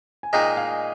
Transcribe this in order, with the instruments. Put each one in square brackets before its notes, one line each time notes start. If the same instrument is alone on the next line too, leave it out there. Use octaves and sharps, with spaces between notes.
[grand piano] G#5
[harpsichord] A#2 G#3 D#4 G#4 [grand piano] D#5 G5
[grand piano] F5 G#5